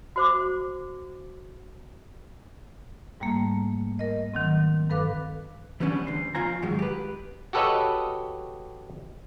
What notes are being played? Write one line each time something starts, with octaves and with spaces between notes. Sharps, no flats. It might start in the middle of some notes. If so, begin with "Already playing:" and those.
F#4 C5 D6
G#2 G3 A3 A#3
A#4 D#5
D#3 F#3 C4
G2 A4 B4 F5 D6 F#6
E3 G3 B3 C#4 D4
D2 C5
F2 B2 F4 C5 G#5 A#5
G#2 D#3 F#3 G#3
G4 B4
F#4 G4 A4 B4 C#5 D#5